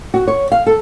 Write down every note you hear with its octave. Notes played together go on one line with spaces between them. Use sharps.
F#4
C#5
F5
A4